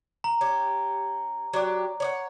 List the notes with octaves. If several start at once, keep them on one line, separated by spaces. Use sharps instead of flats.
A#5
C#4 G4
F#3 D4 G4
C#5 D5 F#5